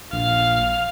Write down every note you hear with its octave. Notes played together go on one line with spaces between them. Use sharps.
A#1 F5